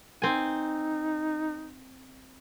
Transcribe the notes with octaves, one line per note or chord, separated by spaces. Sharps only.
C4 D#4 G#5